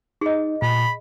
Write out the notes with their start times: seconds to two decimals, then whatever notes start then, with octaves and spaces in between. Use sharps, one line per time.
0.21 D#4 G#4 D#5
0.62 A#2 B5